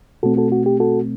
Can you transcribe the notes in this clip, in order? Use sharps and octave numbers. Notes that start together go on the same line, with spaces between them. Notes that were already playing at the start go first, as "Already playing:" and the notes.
B2 A3 C4 F#4 A4
F#4 A4
F#4
G4
F#4 A4